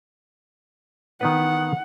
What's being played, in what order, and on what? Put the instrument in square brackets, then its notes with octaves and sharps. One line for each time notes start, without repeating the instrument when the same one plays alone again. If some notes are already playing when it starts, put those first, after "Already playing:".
[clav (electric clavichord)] D#3 B3 B4 [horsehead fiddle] F#5